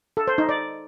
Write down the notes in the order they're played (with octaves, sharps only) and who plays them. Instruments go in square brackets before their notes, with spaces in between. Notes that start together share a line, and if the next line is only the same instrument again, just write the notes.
[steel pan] A4
C5
D#4
D5